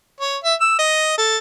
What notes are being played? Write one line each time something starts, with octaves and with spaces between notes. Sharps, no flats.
C#5
E5
E6
D#5
A4